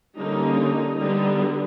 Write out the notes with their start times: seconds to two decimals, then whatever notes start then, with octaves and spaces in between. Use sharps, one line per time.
0.17 D3 G3 A#3 C#4 D#4
0.99 D3 G3 B3 D#4